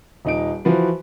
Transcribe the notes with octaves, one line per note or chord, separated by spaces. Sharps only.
D#1 D#4 D7
E3 F3 F#4 B4